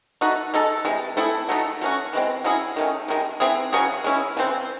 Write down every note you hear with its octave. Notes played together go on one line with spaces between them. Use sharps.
A3 D#4 F#4
G#3 D#4 A4
C3 E3 G#3
A3 C4 E4 G#4
F#3 A3 D#4
F#3 A3 C#4 F#4
E3 G#3 C4
F#3 C#4 E4 G#4
D#3 A3 C#4
C3 D#3 G#3
E3 C4 E4 G#4
C#3 F#3 C#4 G#4
G#3 C#4 E4
C#3 E3 C4